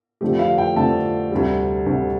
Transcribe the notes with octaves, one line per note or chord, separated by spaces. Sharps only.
F2 D3 F3 A3 G4
F5
G5
F2 D3 F3 A3 A5
D2 C3 G3
D2 C3 G3